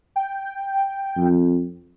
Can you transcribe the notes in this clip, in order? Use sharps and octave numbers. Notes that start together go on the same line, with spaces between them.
G5
F2